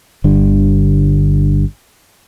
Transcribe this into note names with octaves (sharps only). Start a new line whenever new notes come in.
G1 D3 G3